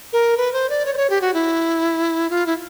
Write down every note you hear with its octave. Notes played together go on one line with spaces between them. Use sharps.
A#4
B4
C5
D5
C#5
C5
C#5
G4
F#4
E4
F4
E4